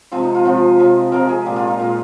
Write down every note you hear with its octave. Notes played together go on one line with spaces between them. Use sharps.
C3 F3 G#3 F4
D#4
F4
C3 F3 G#3 F4
C3 F3 G#3
C3 F3 G#3 A#4
G#4
A#2 G#3 G4
F4
D#4
A#2 G#3